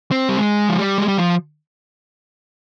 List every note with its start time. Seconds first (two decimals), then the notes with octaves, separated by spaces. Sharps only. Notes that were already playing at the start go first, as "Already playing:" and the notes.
0.11 C4
0.29 G3
0.38 G#3
0.69 F3
0.78 G3
0.98 G#3
1.08 G3
1.18 F3